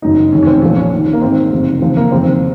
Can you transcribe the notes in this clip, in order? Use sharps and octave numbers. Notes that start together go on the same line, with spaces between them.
F#1 F#2 D#3 D#4
F1 D#2 D#3 C#4
C#4
C4
A#1 A#2 F3 C#4
C#4
D#2 D#3
A#3
G#1 G#2 D#3 C4
F#1 F2 C3
D#2 C#3 F3 C4
A#3
F1 D#2 C#3 F3 C4